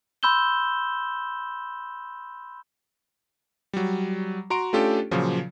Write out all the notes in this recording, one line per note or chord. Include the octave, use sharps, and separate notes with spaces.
B5 C6 E6 G6 E7 G7
F#3 G3
F#4 A#5 C6 D7
A3 C#4 D4 F4 G4 A4
A#2 C#3 F3 F#3